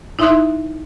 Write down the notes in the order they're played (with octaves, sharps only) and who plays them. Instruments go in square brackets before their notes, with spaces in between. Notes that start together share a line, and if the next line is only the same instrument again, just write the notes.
[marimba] D#4 E4 E5 C6 D#6 F#6